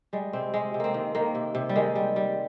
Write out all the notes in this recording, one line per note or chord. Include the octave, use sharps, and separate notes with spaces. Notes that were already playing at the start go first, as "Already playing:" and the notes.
G3 G#3
C3 C4
C3 G#3
C3
A#3 C4
D#3
D#3 A#3
C3
C3
G3
D#3 G#3
G3
G3